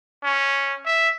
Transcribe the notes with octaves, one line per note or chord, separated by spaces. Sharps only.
C#4
E5